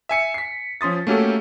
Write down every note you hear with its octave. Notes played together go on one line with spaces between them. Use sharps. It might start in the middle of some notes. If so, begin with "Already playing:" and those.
E5 G#5 C#7
B6 C7
F3 C#4 C6 D#6 A6
A3 A#3 C#4 F#4 G4 A4